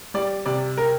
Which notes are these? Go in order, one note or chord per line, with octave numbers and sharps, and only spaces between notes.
G3 D5
C3 D5
A#4